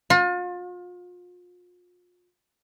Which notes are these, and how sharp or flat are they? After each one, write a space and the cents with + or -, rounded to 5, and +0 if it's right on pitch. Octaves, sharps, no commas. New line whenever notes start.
F4 +35